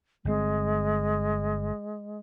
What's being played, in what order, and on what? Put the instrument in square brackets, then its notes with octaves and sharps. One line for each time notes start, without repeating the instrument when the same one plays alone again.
[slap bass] G1 B2 C4 [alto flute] G#3